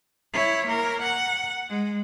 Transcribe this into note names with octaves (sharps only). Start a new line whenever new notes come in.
E4 C#5
A#3 A#4
F#5
G#3